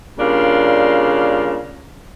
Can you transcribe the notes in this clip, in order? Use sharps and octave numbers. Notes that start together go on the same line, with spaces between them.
C#3 G3 A#3 D4 F4